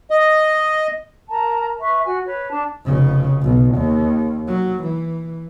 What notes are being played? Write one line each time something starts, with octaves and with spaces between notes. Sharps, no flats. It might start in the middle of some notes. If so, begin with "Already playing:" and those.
D#5
A#4 A5 A#5
B4 E5 C#6
F#4 G#5
B4 C#5
D4 A5
F1 C#3
B1
D#2
F#3
E3